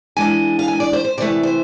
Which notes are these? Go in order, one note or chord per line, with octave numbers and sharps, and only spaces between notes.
E3 G#3 D4 G#5
F5
G#5
D5
C5
C5
C3 E3 A3 D5
C5